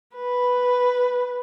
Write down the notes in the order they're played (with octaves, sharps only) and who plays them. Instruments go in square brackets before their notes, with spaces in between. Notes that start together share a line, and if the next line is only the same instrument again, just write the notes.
[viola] B4